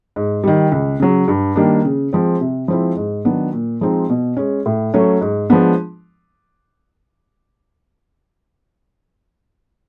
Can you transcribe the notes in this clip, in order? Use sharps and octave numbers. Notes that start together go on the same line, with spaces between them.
G#2
D#3 G3
C#2
C#3 F#3
G2
D#3 G3 A#3 D4
C#3
F3 G#3 C4
C3
F3 G#3 C4 E4
G#2
D#3 F#3 B3 D4
A#2
F3 G#3 C4 D#4
B2
G#3 C#4
A2
F#3 A3 C#4
G#2
F3 G#3 B3 D4